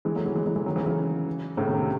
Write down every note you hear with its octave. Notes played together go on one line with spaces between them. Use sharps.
E3 G#3
F#3 A3
E3 G#3
E3 G#3
E3 G#3
E3 G#3
D#3 F#3
C#3 E3
C#3 E3
A2 C#3
C3 D#3
C3 D#3